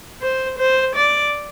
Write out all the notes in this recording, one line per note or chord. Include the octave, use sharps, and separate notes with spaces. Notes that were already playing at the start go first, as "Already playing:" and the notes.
C5
C5
D5